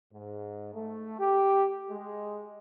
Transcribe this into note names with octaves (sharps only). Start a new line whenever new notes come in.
G#2
A3
G4
G#3